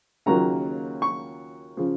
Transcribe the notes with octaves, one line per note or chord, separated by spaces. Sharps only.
D#2 C#3 F#3 A#3 F4 A#5
C#6
C#3 F3